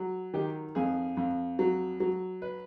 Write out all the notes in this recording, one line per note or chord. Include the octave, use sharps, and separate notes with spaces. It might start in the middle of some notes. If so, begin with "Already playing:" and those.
Already playing: F#3
D#3 G4
F2 G#4
F2
F#3
F#3
B4